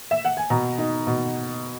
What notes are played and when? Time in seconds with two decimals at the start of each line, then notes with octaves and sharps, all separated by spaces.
0.11 E5
0.25 F#5
0.37 G#5
0.50 B2 A#5
0.78 D#4
1.07 B2